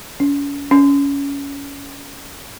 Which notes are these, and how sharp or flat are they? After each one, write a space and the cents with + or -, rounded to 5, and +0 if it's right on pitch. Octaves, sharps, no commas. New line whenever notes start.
C#4 +40
C#4 +20